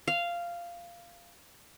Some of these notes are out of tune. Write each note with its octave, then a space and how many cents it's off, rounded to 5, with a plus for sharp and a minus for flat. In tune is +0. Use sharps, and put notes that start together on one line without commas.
F5 -10